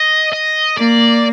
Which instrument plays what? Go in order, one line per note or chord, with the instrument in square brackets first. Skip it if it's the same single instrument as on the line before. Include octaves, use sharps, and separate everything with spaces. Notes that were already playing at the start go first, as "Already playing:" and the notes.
Already playing: [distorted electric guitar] D#5
D#5
[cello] A#3 [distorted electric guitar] D5